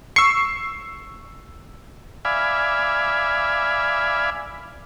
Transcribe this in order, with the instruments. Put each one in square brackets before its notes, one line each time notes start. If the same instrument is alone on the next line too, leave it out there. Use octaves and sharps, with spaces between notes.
[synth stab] C#6 [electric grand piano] E6 C7
[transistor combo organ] D5 E5 F5 G#5 B5